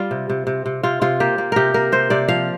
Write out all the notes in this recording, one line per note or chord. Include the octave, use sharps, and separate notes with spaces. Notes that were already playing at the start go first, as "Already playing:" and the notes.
Already playing: G3 F4 D5
C3
C3
C3
C3
C3 F4
C3 F4
A#3 G4
A#3
C3 G4 A#4
A#3 A#4
C3 C5
C3 D5
F3 F5